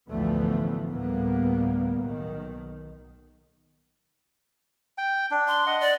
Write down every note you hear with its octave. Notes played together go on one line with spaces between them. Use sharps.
A1 D2 E3 F3 A3 B3
D2 A2 G3 A#3 B3
B1 D#3
G5
D4
C6
D#5 F#5
D5